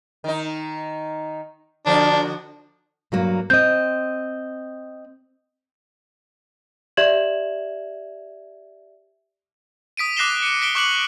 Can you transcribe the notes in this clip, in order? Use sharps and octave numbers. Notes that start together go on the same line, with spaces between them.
D#3 D#4
D3 F3 D4 F#4
G2 F#3 A#3
C4 D#5 G6
G4 D5 E5 G#6 E7 F#7
D#6 B6 D7 D#7
D6 F#6 A#6 C7 E7 G7
C#7 D#7
B6 D7 G7
C#6 D6 F#6 C#7 F#7